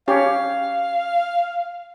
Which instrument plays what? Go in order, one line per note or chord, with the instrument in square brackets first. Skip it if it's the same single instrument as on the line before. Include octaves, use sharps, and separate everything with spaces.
[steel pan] C#4 G4 C#5 [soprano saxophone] F5